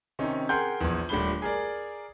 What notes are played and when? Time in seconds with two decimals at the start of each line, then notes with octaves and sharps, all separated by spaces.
0.19 C3 D#3 C#4 D#4
0.49 G#4 A#4 F#5 G5 C6 G6
0.81 A#1 E2
1.09 D#1 G3 A3 D4 B5 G7
1.42 G#4 A#4 D5